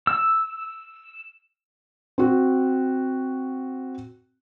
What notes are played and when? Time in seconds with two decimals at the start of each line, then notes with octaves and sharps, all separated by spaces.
0.07 E6
2.18 C4 F#4